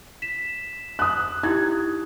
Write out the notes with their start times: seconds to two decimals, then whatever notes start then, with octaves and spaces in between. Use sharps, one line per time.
0.22 B6 E7
0.99 D#6 F#6
1.43 D#4 E4 G4 G#6